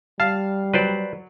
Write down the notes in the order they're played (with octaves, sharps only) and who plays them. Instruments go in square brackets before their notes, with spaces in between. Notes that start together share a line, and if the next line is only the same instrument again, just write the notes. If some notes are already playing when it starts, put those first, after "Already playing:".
[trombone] G3 [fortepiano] F5 [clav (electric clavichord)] A5
[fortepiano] F#3 [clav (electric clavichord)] B4 C5 D5